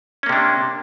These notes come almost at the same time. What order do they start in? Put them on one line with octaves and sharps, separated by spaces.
C#4 A#3 C3 D4